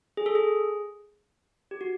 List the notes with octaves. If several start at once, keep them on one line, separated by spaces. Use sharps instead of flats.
G#4
A4
G#4
G4
F#4